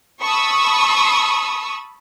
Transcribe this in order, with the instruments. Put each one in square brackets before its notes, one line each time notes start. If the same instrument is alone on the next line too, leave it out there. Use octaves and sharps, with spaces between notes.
[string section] A5 B5 C#6 D#6 E6